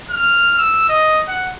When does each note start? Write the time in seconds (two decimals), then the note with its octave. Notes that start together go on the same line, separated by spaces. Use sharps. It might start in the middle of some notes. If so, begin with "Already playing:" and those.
0.10 F6
0.58 E6
0.89 D#5
1.28 F#5